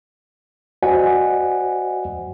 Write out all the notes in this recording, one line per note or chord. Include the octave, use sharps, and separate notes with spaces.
F#4 C5 D5 D#5 F#5 G#5